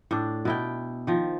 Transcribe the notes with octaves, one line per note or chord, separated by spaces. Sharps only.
A2 D4
B2 E4 G5
D#3 F3